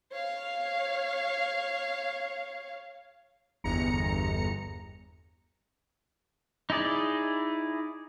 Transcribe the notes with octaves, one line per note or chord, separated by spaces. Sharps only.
C#5 F5
G1 E2 A#5 C#7
D#4 E4 G#4 D5